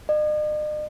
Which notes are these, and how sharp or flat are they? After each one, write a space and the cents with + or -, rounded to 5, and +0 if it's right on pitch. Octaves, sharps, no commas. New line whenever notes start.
D#5 -45